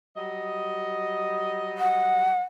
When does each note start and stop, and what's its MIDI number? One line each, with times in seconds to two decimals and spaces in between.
0.16 2.36 54
0.16 2.36 55
0.16 2.36 75
1.78 2.42 78